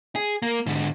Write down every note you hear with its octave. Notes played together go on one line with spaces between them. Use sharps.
G#4
A#3
G#2 D3